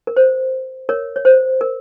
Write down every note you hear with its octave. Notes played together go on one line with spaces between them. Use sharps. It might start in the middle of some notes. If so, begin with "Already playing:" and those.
A#4
C5
A#4 C#5
C#5
C5
A#4